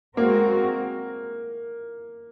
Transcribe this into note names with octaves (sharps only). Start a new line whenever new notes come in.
G#3 A#3 C4 F#4 A#4